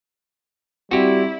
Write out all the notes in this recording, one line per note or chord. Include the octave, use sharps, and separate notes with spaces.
G3 C4 E4 F#4 G4